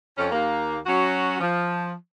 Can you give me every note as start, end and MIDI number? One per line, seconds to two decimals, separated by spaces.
0.18 0.28 41
0.18 0.28 61
0.31 0.78 39
0.31 0.78 58
0.86 1.39 54
0.86 1.39 61
0.86 1.39 66
1.40 1.93 53